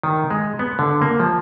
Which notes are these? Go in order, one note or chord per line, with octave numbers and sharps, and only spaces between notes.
D#3
G#3
B3
D3
A#3
F3